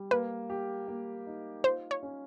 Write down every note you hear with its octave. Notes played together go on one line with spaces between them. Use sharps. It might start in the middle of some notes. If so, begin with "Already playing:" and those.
Already playing: G3
A#3 B4
G4
A#3
D#4
F4 C5
C#5
C#4